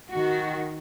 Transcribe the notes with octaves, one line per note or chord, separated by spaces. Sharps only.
D#3 F#4